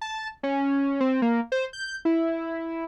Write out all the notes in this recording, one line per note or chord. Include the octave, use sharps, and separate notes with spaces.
A5
C#4
C4
A#3
C5
G6
E4